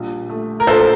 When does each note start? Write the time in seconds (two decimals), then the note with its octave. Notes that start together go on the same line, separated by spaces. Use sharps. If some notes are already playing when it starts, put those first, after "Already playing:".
Already playing: A#1 G3
0.29 A3
0.60 A#4
0.67 A#1 A4 C5